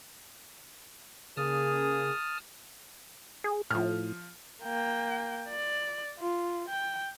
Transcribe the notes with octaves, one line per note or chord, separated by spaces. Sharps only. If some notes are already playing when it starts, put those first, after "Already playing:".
C#3 A#3 G#4 A5 D#6 F6
G#4
A2 F3 F6
A#3 G5
D5
F4
G5